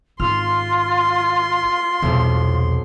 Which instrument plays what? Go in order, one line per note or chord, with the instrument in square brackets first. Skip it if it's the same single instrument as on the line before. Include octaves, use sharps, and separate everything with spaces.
[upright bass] G#1 [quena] F4 [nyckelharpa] C6 [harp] F6
[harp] B1 C3 [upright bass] E2 G3